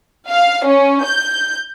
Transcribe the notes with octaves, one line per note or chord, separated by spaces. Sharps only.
F5
C#4
G6